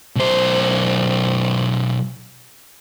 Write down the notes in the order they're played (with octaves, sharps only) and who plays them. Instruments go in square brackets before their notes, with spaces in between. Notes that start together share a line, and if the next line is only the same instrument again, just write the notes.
[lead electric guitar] B1 C5